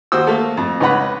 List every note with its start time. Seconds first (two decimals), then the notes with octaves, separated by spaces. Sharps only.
0.12 D#2 F#4 C5 D#6 E6
0.27 A3 A#3 A4
0.57 F2
0.80 C#2 D#4 B4 F#5 B5